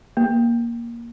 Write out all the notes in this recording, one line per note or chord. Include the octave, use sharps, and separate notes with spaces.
A#3